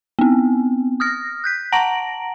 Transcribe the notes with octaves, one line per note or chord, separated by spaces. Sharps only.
B3 C4
D#6 F6 A#6
F#6 G6 B6
F#5 A5 A#5 A#6 D7 F#7